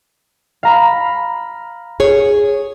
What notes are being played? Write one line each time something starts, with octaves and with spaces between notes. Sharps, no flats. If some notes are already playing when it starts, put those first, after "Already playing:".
F5 A#5 B5
G#4 C#5